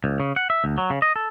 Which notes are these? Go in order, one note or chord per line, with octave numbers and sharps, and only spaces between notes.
C#2
C#3
F#5
E5
D2
F#3
C#3
D#5
A4